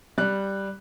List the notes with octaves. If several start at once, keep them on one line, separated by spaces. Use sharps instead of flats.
G3 F#6